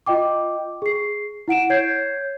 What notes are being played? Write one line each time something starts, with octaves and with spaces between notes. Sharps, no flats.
F4 D#5 G5 D6
G#4 C7
E4 F#5 D7 E7
C#5 G6 G#6 C7